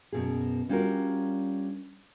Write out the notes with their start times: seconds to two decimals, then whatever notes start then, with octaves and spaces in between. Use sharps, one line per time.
0.13 F#2 B2 G#4
0.69 G3 C#4 D4 F4 F#4 A#4